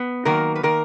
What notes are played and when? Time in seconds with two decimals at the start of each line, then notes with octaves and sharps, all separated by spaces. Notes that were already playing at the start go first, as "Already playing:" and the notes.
Already playing: B3
0.25 D#3 F#3 A#3 A#4
0.56 B4
0.63 D#3 A#3 A#4